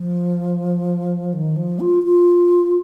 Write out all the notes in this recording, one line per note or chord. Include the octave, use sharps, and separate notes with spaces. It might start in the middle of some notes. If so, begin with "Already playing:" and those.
Already playing: F3
D#3
F3
F4
F4